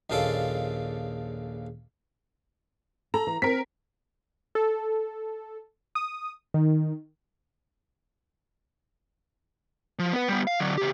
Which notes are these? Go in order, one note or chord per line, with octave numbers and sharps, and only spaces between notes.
A#1 D#2 C#3 F4 A4 D5
A4 A#5
E3
C4 A#4 B6
A4
D#6
D#3
F3
B3 B4
G3 B3
F5
D3 F#3
C#3 G4